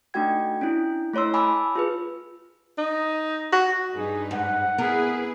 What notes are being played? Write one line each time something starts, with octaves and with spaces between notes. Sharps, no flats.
A3 D4 D#4 F#4 G5 G#6
C#4 D4 E4
A3 E4 C#5 C6 E6
G#5 A5 B5 D6 E6
F4 G#4 B4
D#4
F#4
G2 D#4 G#4 B4
G#2 F#5
B3 E4 G#4 A#4 B4